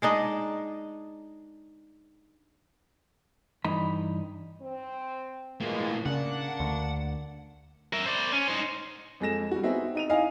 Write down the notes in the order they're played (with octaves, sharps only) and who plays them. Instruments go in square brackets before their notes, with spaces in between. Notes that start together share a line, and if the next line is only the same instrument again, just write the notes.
[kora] G#3 D4 D#4 D#5
[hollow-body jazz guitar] G2 E3 D#4 B5
[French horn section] C4
[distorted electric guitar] A2 A#3 [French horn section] E3 G#3
[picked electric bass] C#3 [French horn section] A#3 D4 [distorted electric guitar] F#5
[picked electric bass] D2
[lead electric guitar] A#4 E5
C5 D5
C#4
D#4 C5
[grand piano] F2 G#3 A4 A#6 E7
G3 F#4
B3 C4 D#4 F#4 G#4 E5
D#4 D#7 F7
D#4 E4 D#5 F5 G#5